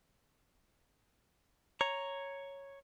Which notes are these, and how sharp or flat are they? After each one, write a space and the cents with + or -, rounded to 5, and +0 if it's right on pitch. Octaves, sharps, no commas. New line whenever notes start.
C#5 +0 A#5 +0